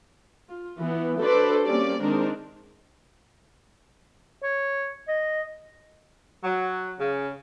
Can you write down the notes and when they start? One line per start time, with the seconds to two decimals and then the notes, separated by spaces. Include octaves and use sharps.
0.49 F4
0.79 E3 B3
1.20 D4 F#4 A4 B4 C5 D5
1.64 G3 A#3 C4 C#4 G4 D5
2.01 D#3 G#3 C4 D4 D#4 A#4
4.43 C#5
5.08 D#5
6.44 F#3
6.99 C#3